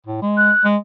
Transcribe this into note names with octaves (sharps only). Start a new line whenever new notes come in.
A2
G#3
F#6
G#3